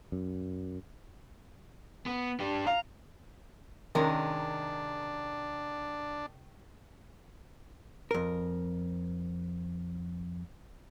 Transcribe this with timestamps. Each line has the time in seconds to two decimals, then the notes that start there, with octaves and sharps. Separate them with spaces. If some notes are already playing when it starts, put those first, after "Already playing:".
0.12 F#2
2.06 B3
2.40 D4 G4
2.67 F5 A#5
3.95 C3 D#3 G#3 C#4 D4 A#4
8.11 F2 A#4